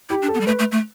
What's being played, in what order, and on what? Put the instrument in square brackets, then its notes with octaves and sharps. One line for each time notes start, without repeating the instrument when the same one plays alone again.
[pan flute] E4 [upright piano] G4
[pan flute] D4
[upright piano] A4
[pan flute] B3
G3
[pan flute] A3 [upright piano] B4
[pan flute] A3
A3